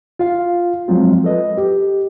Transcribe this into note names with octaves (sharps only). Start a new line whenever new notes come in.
F4 F5
F3 F#3 G#3 C4 F4
A4 B4 D#5
G4